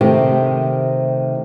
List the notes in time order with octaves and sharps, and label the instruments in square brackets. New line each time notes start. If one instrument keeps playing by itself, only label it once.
[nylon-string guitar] C3 D#3 A3 G4